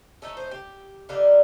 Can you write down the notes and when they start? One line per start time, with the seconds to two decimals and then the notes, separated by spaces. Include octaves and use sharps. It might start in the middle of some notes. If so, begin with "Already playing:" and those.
0.22 A2 A3 D#4 A4
0.37 C5
0.51 G4
1.09 D3 G3 A#3 D#4 F4